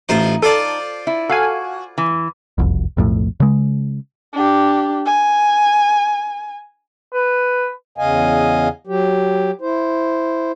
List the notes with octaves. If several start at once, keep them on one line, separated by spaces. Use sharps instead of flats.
A1 D#4 F4 C5
F4 A4 C5 D5
E4
F#4 A4 F5 G#5
E3
F#1 C2 F2
B1 F2 A2
C#3 G#3
D4 G4
G#5
B4
E2 C#3 D#5 F5 G#5
F#3 G4
E4 C5